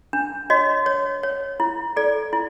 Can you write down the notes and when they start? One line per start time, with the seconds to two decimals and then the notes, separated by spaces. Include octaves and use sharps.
0.13 D4
0.50 F#4 C#5 D#5
0.86 C#5
1.23 C#5
1.60 E4
1.96 A4 D5
2.33 E4